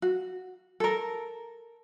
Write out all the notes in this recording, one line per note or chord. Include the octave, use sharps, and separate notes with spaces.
F#4
A4 A#4